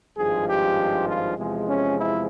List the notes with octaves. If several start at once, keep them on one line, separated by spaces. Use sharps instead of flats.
G#1 G2 F3 G#3 G#4
G4
F4
E2 C3 F3 G#3
C#4
E4